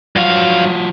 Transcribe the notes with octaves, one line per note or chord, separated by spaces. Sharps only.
G2 F3 F#3 F#4 F5